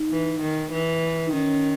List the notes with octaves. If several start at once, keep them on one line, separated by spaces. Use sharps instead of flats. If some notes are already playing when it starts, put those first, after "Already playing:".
Already playing: D#4
E3
D#3
E3
D#4
D#3 C#4